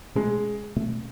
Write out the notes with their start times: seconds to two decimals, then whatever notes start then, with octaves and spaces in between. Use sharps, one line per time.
0.15 B2 G#3 A3 C#4
0.76 B2 A3 C#4